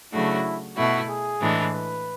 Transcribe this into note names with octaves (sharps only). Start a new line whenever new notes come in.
C#3 F#3 A3 D4 E4 F#4
B2 A3 E4 F#4
G#4
A2 E3 G#3 D4
B4